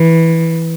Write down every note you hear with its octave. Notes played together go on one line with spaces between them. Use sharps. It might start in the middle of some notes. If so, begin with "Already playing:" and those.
Already playing: E3